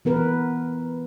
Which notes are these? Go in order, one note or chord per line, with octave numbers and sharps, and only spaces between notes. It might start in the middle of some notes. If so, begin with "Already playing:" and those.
E3 B3 A#4 B4